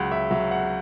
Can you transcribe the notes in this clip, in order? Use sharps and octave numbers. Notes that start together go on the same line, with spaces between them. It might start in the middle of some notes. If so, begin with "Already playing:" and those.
Already playing: C#2 F#3 F#5
E5
F#3 E5
F#5